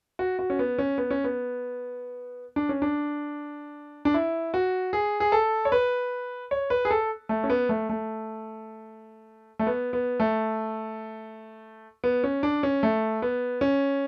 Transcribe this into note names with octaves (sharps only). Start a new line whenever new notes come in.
F#4
F#4
C#4
B3
C#4
B3
C#4
B3
D4
C#4
D4
D4
E4
F#4
G#4
G#4
A4
C#5
B4
C#5
B4
G#4
A4
A3
C#4
B3
A3
A3
A3
B3
B3
A3
B3
C#4
D4
C#4
A3
B3
C#4